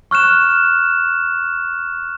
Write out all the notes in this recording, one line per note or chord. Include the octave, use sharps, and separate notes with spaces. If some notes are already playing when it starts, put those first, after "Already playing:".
C#6 F6 F#6 E7